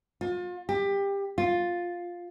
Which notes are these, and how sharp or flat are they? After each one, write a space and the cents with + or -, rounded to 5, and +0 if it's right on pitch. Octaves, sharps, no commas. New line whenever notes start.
F4 +35
G4 +20
F4 +5